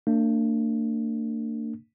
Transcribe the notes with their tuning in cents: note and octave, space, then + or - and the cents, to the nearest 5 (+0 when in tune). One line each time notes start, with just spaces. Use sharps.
A#3 -45 D4 +5